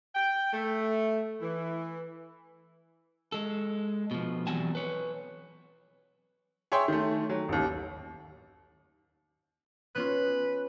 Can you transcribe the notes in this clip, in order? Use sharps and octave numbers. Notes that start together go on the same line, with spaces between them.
G5
A3
E3
G#3 A4
B2 F3
E3 F#3 G3 C4 G#5 A5
B4 C#5
G#4 C#5 E5 G5 C6
D#3 A3
F#3
A1 D#2
B3 C#4 F4 B4